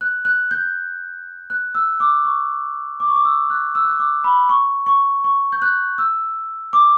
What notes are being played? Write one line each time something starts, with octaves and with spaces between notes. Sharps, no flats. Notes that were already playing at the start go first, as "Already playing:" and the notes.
F#6
F#6
G6
F#6
E6
D6
C#6
D6
C#6
D6
E6
F#6
E6
F#6
E6
D6
B5
C#6
C#6
C#6
G6
F#6
E6
D6